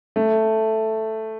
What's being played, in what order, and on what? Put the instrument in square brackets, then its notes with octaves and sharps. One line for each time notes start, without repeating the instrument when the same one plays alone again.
[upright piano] A3